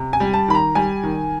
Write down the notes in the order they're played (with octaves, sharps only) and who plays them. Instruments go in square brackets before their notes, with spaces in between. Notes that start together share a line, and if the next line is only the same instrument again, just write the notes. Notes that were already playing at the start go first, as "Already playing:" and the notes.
Already playing: [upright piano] C3
G#5
G3
A5
D#3 B5
A#5
G3 G#5
D#3